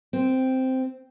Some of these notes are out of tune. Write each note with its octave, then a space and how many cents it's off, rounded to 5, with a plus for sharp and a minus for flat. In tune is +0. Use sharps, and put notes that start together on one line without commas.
C4 -5